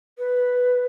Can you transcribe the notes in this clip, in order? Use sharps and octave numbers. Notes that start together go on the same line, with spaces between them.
B4